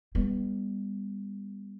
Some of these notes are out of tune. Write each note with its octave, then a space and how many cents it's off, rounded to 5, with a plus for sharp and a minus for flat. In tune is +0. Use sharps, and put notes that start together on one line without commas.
G3 +30 B3 +0